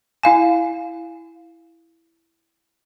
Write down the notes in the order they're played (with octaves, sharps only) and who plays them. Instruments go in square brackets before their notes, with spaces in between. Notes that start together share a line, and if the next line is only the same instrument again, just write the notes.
[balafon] E4 F5 G#5